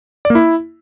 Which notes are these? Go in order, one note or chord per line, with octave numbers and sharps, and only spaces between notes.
D5
A#3
E4